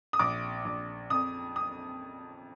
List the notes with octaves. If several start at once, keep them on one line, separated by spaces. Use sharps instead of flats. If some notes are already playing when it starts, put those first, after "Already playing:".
D#6
A#1 D6
A#1
F2 D#6
D#6